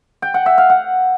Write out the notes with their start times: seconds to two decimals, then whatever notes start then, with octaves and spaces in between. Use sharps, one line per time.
0.22 G5
0.34 F#5
0.46 E5
0.58 F5
0.70 F#5